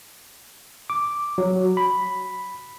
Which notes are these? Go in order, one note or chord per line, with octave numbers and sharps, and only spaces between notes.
D6
F#3
B5